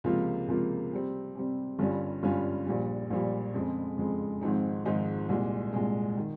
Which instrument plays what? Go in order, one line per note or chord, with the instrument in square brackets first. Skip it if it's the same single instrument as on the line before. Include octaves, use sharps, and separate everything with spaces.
[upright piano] C#2 C3 F3 A#3 F4
C#2 C3 F3 A#3 F4
C3 G3 C4
C3 G3 C4
G1 G2 G3 C#4 F4
G1 G2 G3 C#4 F4
A#1 A#2 G3
A#1 A#2 G3
F2 C#3 G#3 C4
F2 C#3 G#3 C4
G#1 G#2 F3 C4 D#4
G#1 G#2 F3 C4 D#4
C2 A#2 G#3
C2 A#2 G#3
D#3